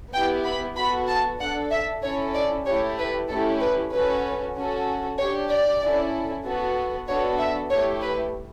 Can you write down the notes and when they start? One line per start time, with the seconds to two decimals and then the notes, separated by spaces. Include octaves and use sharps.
0.13 B3 E4 G4 G5
0.45 B5
0.76 B3 F#4 A4 B5
1.08 A5
1.39 D4 A4 F#5
1.71 E5
2.02 C#4 E4 A4 C#5
2.34 D5
2.66 A3 E4 G4 C#5
2.97 B4
3.28 A3 C#4 E4 G4 A4
3.60 B4
3.92 C#4 F#4 A4 B4
4.55 C#4 F#4 A4
5.18 D4 G4 C#5
5.49 D5
5.81 C#4 E4 A4
6.44 B3 F#4 A4
7.07 B3 D4 F#4 A4 C#5
7.39 E5
7.70 A3 E4 G4 C#5
8.01 B4